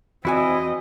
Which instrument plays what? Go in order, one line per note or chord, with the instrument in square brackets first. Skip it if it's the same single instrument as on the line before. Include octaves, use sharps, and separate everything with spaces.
[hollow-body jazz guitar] E2 F#4 G#5 [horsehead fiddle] C4 D#5 [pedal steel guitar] E4